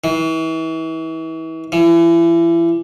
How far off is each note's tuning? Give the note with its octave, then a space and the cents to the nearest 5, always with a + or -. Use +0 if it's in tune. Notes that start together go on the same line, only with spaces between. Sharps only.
E3 -35
E3 +30